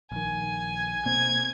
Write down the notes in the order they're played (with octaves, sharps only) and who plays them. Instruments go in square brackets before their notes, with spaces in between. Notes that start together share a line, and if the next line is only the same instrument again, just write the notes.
[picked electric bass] A#1 D#3 [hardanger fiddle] G#5
[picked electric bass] B2 A#3 C4 [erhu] G#6